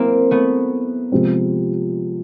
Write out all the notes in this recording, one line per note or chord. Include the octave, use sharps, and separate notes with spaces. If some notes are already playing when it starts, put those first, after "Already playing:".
Already playing: F#3 A#3 C4 E4
A3 B3
C3 F3 G#3 C4